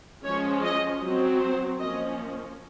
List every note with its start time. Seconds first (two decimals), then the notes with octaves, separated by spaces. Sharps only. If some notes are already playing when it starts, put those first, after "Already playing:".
0.24 F3 G#3 C#4 C#5
0.64 D#5
1.01 F#3 C4
1.39 C5
1.79 F3 A#3 C#4 D#5